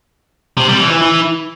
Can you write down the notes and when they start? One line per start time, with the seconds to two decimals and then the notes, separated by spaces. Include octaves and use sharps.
0.57 C3
0.68 G3
0.79 E3
0.91 E3
1.02 E3